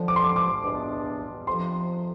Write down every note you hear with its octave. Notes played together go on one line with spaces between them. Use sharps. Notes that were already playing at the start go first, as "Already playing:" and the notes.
Already playing: F2 D3 F3
D6
C6
D6
D6
E2 B2 B3 D4
F2 C3 F3 C6